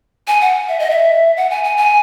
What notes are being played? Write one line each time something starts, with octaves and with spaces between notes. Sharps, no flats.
G#5
F#5
E5
D#5
E5
F#5
G#5
G#5
G#5